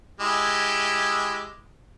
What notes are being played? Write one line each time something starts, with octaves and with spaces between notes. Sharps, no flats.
G#3 E4 G4